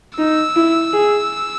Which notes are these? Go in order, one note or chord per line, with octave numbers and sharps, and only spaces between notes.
D#4 E6
E4
G#4